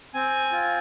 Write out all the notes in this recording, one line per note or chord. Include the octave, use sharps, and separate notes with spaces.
C4 G#5
F4